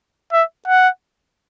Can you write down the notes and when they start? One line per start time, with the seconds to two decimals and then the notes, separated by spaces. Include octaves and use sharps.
0.32 E5
0.68 F#5